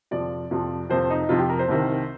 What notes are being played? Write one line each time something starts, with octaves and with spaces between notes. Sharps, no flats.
F2 C3 F3 D5
F2 C3 F3
F2 C3 F3 C5
D#4
F2 C3 F3 F4
G4
A#4
C5
C2 C3 D#3